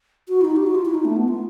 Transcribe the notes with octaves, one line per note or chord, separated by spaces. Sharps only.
F#4
E4
D#4
G4
F#4
F4
E4
D#4
A3
B3
F4